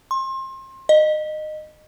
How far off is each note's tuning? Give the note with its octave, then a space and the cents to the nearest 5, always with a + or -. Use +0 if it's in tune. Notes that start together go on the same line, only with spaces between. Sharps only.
C6 +30
D#5 -20